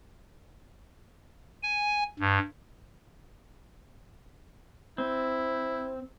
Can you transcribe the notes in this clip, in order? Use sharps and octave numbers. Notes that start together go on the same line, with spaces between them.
G#5
G2
C4 E4